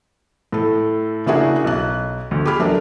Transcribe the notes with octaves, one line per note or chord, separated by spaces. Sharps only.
A2 A4
C#3 A#3 D4 E4 F#4 G#4
B1 F#6
D2
G4 G#4 B5 F6
F#3 A3 D4 A#4